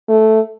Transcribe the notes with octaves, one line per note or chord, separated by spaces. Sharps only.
A3